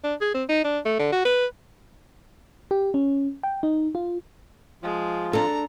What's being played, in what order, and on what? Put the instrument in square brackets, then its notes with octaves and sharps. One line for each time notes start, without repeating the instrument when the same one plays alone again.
[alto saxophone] D4
G#4
C4
D#4
D4
A3
D3
F#4
B4
[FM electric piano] G4
C#4
G5
D#4
F4
[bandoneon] F3 F4 [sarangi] G#3
[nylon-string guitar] D4 A4 [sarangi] A#5